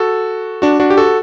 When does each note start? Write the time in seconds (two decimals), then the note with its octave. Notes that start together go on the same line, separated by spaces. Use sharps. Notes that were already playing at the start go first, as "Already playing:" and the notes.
Already playing: F#4 A4
0.62 D4 F#4
0.80 D4 F#4
0.90 G4
0.97 F#4 A4